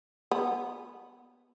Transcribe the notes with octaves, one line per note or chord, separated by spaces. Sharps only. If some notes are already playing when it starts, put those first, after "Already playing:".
B3